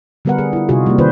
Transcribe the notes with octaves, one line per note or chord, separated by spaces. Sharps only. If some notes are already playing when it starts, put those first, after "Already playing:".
D3 G3 B3 A#4 B4 F#5
G#4
E4 F4
C3 G3 D#4 F4 F#4 G#4
G3 A#3
D#3 C#4 E4 F4 B4 C5